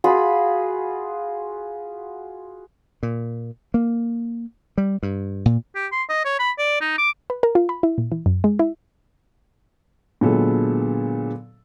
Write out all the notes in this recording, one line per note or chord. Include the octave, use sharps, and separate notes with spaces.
F4 F#4 G#4 B5
A#2
A#3
G3
G2
A#2
G4
C6
D#5
C#5
B5
D5
D#4
D6
B4
A#4
F4
B5
E4
A#2
E3
F#2
G#3
E4
A#2 D3 F#3 G#3 B3 A4